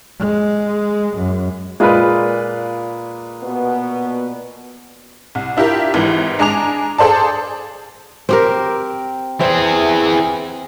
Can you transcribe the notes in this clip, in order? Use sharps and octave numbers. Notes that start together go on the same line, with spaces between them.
G#3
F#2
A#2 G#3 F4 B4 D6
B2 B3
C2
D4 E4 F4 G4 A#4
G#1 G#2 E3
G#3 D4 G#5 A#5 D6 F7
G#4 A4 C5 D5 A5
C4 G4 A#4
E3 C4 G#4